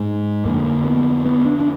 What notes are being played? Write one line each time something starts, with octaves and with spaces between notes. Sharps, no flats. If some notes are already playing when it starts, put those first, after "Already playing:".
Already playing: G#2 G#3
F2 D3 A#3
B3
B3
D4
D4